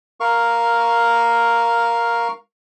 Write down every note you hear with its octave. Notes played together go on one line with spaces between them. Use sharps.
A#4 F5 C#6